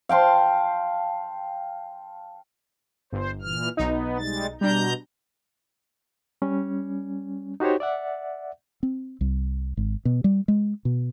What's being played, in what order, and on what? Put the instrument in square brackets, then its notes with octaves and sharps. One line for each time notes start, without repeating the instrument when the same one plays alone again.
[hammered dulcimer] F5 G5 A5 C6
[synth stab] G1 [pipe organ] C5
[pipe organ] A#2 E3 F6
[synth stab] B1 D#4 [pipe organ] B3
[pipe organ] G3 G#3 A6
[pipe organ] B2 A#5 G6 [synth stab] G3 D4
[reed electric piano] G3 C#4
D#4 F#4 G4 C5 C#5
D5 E5 F#5
[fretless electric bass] C4
C2
G#1
B2
G3
G#3
B2